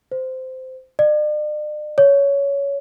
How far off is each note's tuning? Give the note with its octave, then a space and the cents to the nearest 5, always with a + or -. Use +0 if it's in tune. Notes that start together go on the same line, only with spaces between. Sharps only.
C5 -15
D5 +45
C#5 +15